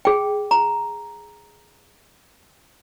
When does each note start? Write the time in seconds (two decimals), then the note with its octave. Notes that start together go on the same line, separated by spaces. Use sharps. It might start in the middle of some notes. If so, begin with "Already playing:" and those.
0.05 G#4 G5
0.51 A#5